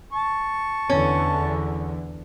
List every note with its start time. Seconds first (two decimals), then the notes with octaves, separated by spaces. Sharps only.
0.13 A5 C#6
0.90 E2 D3 E3 C#4